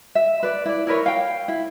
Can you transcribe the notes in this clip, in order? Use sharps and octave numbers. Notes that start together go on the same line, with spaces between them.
E5
B4 D5
E4 D5
E4 A#4 B4 C#5
F5 G5
E4